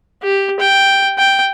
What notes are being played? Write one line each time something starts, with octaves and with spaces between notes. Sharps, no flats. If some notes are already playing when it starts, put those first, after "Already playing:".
G4
G5
G5